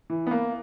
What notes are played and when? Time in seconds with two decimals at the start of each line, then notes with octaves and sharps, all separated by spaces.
0.10 E3
0.27 B3
0.31 A#3